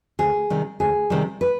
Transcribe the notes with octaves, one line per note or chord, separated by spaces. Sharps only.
D2 G#4
C3 D#3 G3
D2 G#4
C3 D#3 G3
B4